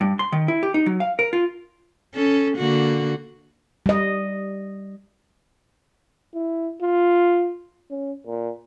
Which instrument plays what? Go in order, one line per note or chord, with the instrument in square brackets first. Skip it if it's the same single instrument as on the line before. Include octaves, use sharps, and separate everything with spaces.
[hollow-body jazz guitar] G2
C6
D#3
E4
G4
D#4
F#3
F5
A#4
F4
[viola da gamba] C#4 A4
D3 A#3 F#4
[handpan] G3 D#5
[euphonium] E4
F4
C#4
A#2